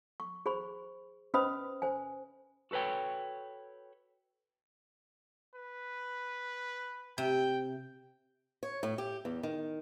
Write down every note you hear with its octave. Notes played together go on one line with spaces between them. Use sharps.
C#6
G#4 C5 B5 C#6
C#4 B4 C5 D#5 B5 D#6
C5 G#5
F#4 A4 B4 C#5 G5
B4
C3 G5
C#5
A2
G4
E2
D#3